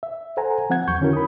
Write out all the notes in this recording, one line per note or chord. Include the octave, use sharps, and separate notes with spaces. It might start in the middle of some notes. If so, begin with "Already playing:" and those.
E5
A4 C5 F#5 G#5 A#5
F3 C4 F#5 G#6
E2 F#3 C#6 G6
D3 D#3 C#4 E4 F#4 A#4
B5 D#6